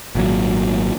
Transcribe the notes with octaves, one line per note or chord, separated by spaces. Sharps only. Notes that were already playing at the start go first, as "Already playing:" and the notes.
G#1 A#2 F#3